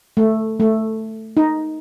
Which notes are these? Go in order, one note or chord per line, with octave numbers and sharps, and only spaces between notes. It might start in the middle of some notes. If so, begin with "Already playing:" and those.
A3
A3
D#4